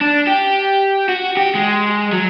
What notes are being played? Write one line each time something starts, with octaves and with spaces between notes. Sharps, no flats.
D4
G4
F#4
G4
G#3
F#3